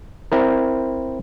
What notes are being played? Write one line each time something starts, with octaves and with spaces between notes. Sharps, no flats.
C4 E4 A#4